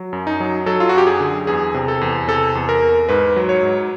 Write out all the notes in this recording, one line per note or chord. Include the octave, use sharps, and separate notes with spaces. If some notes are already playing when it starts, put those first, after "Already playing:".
Already playing: F#3
F#2
D#4
F#3
F#3 A4
F4
F#4
F#2 G4
G#4
D3
E2 G#4
C3
A4
E2
C3 A4
E2
A#4
E2
G#2 B4
F#3
C#5
G#2